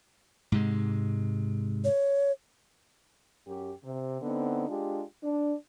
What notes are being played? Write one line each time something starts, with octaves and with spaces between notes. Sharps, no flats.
G#2 C3 G#3
C#5
F#2 G4
C3
D3 B3 C4 D#4
G#3 D4 F4 G4
D4